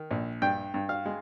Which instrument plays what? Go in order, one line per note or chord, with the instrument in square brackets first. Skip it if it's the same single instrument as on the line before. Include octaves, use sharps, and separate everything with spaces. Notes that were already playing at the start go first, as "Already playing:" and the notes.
Already playing: [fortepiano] D#3
A#1
G2 G5
G2
F5
G#3